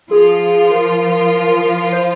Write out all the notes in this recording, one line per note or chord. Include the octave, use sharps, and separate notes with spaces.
F3 F4 G#4
A#4
C5